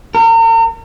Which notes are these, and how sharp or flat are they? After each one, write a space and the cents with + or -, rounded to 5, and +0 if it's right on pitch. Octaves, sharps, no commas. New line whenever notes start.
A#4 -40